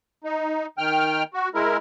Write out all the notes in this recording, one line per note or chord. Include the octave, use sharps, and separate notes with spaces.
D#4
D#3 G5 F6
F#4
G#3 E4 A#4